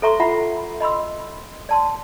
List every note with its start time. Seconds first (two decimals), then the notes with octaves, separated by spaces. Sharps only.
0.02 A4 C5 E5 A#5 C6 C#6
0.20 F4 E5 F#5 A#5 B5
0.80 D#5 B5 C6 E6
1.69 D5 A5 C6